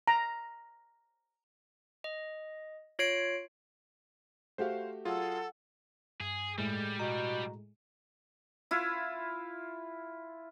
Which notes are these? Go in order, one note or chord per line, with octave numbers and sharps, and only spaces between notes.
A#5
D#5
F4 C#5 C7 D7
A3 F#4 G4 C5 F5
F#3 F4 G#4 A4 F#5 E6
G2 G#4
A2 G3 G#3
B2 A#5
E4 F4